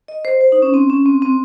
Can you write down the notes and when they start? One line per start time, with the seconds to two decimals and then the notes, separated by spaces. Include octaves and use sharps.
0.08 D#5
0.25 C5
0.41 C5
0.52 D#4
0.62 C#4
0.74 C4
0.90 C#4
1.06 C4
1.22 C4